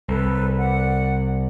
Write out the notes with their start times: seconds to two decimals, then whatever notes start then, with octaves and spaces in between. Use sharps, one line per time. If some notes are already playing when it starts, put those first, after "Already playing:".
0.08 C2 A4 B4
0.57 D5 F#5